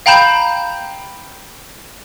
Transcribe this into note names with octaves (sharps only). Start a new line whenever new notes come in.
F5 G5 A#5 B5 G6 E7